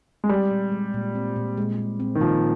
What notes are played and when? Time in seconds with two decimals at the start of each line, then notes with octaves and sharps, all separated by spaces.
0.24 G#3
0.29 G3 C4
0.51 A#2
0.72 G#3
0.94 A#2
1.15 C4
1.36 A#2
1.57 G#3
1.79 A#2
2.00 C4
2.15 D#3
2.20 A#2 F3